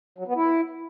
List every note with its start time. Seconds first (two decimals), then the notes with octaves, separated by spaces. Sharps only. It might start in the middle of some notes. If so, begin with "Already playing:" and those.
0.18 F#3
0.27 B3
0.36 E4